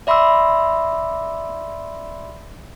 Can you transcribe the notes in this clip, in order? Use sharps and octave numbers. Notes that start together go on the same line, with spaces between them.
D5 E5 B5 C6 D6 E6